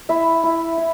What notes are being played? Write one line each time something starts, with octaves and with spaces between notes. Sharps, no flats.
E4 E5
E4
E4